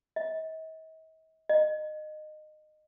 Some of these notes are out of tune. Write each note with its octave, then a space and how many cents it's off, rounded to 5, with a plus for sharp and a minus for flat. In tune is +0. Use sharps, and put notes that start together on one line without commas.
D#5 +45
D#5 -20